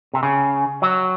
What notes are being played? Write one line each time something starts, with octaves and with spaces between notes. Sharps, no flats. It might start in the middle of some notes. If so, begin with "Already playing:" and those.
C3
C#3
F#3